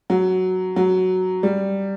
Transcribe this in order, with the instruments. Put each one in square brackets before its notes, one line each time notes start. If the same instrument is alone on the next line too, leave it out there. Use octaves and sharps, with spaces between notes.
[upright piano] F#3
F#3
G3